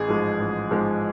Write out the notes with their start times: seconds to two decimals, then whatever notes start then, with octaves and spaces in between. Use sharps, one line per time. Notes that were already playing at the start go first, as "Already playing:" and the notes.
Already playing: A1 G#4
0.08 G#2 F3 G#3
0.40 A1
0.71 G#2 F3 G#3